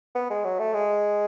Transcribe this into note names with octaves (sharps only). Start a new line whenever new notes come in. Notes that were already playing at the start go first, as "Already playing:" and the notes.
B3
G#3
F#3
A3
G#3